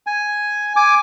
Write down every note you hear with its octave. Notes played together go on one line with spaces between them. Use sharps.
G#5
G#5 D6